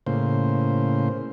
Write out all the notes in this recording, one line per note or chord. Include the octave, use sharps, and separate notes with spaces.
A2 C#3 A#3 C5